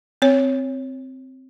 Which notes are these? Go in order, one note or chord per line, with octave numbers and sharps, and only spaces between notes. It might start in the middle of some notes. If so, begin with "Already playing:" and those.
C4 C#5